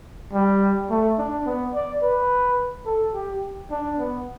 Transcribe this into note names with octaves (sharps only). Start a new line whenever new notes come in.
G3
A3
D4
B3
D5
B4
A4
G4
D4
B3